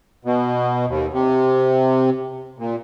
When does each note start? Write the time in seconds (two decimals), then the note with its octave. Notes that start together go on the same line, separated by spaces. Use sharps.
0.25 B2
0.88 D#2
1.13 C3
2.59 A#2